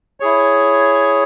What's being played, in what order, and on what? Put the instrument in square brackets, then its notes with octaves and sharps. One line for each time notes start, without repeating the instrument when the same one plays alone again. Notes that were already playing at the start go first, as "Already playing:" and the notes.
[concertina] E4 G#4 C#5